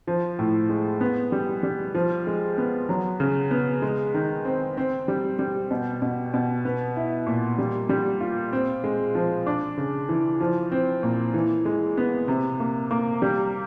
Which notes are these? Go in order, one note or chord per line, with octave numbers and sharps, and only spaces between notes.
F3
A2
G#3
B3
G3
G3
F3
G#3
B3
F#3
C#3
B3
G#3
D#3
C4
C4
G3
G3
B2
B2
B2
B3
E4
A#2
G3
G3
F4
C4
G#3
F3
D4
C#3
E3
F3
C4
A#2
E3
G#3
B3
C3
A#3
A#3
G3